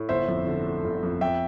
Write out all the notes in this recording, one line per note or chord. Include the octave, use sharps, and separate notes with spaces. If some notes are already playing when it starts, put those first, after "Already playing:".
Already playing: A2
G1 C5 E5
F2
D3
A3
G1
F2
F2 E5 G5